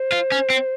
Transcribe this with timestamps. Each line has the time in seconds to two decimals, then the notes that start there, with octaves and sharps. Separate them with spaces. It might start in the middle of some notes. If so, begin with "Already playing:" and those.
Already playing: C5
0.12 F4
0.32 C#4
0.50 C4